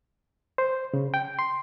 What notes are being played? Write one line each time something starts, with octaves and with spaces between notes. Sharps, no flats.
C5
C#3
G5
C6